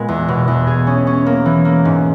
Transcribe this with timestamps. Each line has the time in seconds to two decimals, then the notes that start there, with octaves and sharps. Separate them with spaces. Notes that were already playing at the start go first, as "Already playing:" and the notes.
Already playing: A#2 G#3 B3
0.08 E2
0.28 B2
0.48 E2
0.67 G#4
0.87 C#4
1.07 C#4
1.26 A#3
1.45 E3
1.65 A#3
1.85 G#2